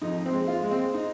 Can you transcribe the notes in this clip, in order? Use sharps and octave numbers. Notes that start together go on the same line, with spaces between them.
F2 D#4
C4
G#3
F4
G#3
C4
D#4